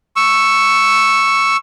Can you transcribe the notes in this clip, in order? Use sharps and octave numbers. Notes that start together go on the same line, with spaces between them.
C#6 E6